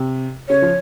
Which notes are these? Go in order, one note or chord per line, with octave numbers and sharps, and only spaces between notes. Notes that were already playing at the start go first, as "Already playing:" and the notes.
Already playing: C3
C#3 C#5
F3